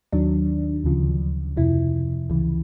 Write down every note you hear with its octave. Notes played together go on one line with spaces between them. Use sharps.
D#2 D#3 F#3 D4
D2 C#3 F3
F2 C3 F3 E4
C#2 C#3 E3